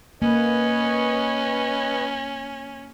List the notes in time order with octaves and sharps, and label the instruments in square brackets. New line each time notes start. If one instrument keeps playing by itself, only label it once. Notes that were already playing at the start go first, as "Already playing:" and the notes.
[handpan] A#3 [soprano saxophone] C#4 [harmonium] B4 C#5 D#5